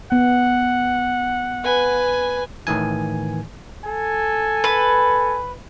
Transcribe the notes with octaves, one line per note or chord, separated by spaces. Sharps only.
B3 F#5
B4 G#5
A2 D#3 E3 G#5
A4 G#5
B4